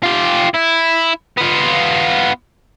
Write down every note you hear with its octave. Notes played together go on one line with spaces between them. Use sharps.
F4 G4
E4
B3 F4